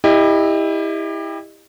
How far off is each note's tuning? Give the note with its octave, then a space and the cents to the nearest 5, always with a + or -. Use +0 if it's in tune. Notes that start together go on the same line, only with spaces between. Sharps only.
E4 -15 G4 +30 D#5 -25